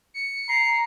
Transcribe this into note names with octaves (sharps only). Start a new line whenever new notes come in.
C#7
A#5 C7